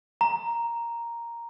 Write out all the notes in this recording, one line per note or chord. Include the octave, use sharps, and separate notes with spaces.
A#5